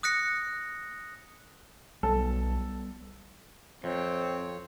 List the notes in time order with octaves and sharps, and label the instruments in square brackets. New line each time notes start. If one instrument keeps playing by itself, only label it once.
[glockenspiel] D#6 F#6 A#6 C#7
[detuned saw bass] B1 [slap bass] G3 B3 [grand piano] A4
[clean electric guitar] F2 [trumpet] C4 [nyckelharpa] C#5